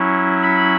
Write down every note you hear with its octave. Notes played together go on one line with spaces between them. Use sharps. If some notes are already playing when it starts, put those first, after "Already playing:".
Already playing: F#3 C#4 E4
B5